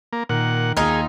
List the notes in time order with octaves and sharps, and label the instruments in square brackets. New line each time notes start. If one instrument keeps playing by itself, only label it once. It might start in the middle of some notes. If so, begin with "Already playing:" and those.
[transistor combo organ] A#3
[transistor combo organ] A#2 F#5 [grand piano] D#3
[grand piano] D#2 [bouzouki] D#4 F4 [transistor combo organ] G#4